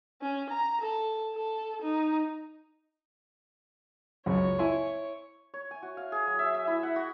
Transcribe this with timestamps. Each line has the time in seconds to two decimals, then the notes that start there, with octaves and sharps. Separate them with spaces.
0.22 C#4
0.50 A#5
0.81 A4
1.35 A4
1.82 D#4
4.26 C#2 F#2 C#3 C#5
4.59 E4 G#5 C6
5.54 C#5
5.71 G#5
5.83 F#4
5.97 F5
6.12 G#4
6.27 F#3
6.39 E5
6.55 E5
6.67 E4
6.83 F#5
6.96 F#4